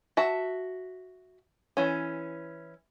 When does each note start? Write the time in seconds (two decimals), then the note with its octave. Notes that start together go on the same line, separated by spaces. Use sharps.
0.17 F#4 E5 A5
1.77 E3 C#4